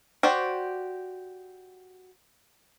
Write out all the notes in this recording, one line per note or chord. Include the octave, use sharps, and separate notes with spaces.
F#4 G4 C5 D5